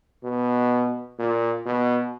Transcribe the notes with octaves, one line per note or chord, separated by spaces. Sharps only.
B2
A#2
B2